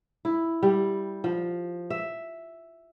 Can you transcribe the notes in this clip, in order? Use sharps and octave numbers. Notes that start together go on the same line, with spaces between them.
E4
G3
F3
E5